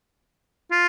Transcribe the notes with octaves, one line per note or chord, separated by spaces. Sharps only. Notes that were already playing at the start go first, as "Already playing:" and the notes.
F4